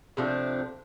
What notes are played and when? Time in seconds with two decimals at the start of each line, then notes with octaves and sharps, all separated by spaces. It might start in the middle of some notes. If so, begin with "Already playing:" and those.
0.17 C3 F3 A3 D4